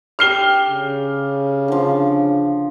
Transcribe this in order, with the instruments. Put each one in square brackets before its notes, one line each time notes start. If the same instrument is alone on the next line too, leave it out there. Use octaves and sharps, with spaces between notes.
[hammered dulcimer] G4 A4 D5 [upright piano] F6 C7 G7
[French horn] C#3
[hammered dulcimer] D3 F3